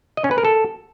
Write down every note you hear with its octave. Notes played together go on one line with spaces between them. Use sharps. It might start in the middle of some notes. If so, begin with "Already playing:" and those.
D#5
C#4
B4
A#4
A4